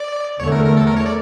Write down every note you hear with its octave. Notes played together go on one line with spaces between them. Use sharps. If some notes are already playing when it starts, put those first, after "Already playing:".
Already playing: D5
E2 D3 A3 C#5
A#4
A#4
A4
A#4
C#5
D5